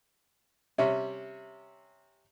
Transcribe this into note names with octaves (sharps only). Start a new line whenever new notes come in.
C3 G3 C#4 E5